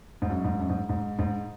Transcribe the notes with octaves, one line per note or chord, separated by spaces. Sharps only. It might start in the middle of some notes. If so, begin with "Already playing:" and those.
G#2
F#2
G#2
F#2
G#2
G#2
G#2